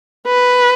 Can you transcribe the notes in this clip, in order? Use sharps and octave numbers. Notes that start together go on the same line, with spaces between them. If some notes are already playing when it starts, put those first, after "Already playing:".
B4